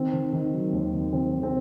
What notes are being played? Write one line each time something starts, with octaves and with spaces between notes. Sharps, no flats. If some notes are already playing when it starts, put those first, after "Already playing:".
Already playing: D#3 C4
D#3
D#3
F#3
D#2
D#3
D#3 C4
D#3
C4